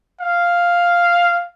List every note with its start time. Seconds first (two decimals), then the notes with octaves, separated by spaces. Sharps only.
0.21 F5